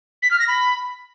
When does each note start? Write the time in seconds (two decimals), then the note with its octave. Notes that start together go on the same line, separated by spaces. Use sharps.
0.23 B6
0.31 F6
0.39 A#6
0.48 B5